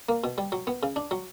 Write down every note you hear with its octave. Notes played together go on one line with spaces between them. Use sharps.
A#3
B2
G3
F#3
B3
C#3
D4
F#3